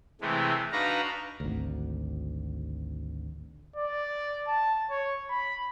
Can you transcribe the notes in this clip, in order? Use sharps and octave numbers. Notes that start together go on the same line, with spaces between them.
C3 E3 G#3 A3
D4 D#4 F#4 B4 F5 A#5
G#1 D2
D5
A5
C#5
B5